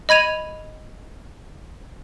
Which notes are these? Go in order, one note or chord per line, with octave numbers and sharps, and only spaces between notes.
D#5 B5 G#6 D#7 F7